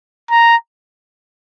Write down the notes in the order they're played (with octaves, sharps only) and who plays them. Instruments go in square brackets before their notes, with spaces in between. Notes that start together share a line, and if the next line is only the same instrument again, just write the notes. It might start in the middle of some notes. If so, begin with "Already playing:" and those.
[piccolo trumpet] A#5